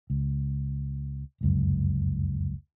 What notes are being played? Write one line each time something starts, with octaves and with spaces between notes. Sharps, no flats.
C#2
F1 C#2 F#2